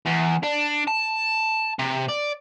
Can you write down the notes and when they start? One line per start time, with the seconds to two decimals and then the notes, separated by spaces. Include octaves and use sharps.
0.06 E2
0.43 D4
0.87 A5
1.79 C3
2.08 D5